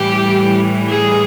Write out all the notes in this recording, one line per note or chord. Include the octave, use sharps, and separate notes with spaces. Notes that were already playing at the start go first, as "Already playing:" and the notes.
Already playing: A2 E3 G3 G4
G#4